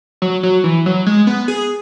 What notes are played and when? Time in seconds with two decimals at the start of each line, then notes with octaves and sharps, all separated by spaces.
0.22 F#3
0.43 F#3
0.64 E3
0.86 F#3
1.06 G#3
1.27 B3
1.48 G#4